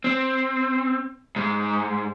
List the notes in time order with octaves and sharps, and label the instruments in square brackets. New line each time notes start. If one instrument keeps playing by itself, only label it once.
[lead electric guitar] C4
G#2